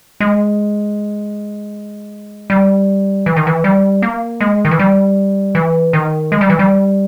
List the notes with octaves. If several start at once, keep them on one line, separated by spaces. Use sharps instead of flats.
G#3
G3
E3
D#3
E3
G3
A#3
G#3
D#3
E3
G3
E3
D#3
G#3
G3
E3
G3